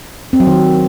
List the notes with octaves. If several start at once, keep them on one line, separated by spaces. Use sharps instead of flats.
C4
F#3
D#3